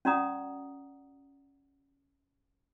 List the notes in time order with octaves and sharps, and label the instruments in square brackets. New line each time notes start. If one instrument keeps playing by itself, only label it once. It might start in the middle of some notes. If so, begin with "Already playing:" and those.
[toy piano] C#4 F#4 D5 F#5 A#5 D#6